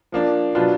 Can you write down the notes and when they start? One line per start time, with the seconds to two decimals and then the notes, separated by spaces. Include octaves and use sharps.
0.12 F3 A#3 D4
0.55 B2 F#3 D4 F4 B4